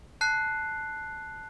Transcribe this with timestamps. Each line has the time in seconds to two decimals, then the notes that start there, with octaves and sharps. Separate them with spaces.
0.21 A5 F#6 C7